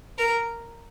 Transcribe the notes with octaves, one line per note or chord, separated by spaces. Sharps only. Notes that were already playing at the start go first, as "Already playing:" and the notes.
A#4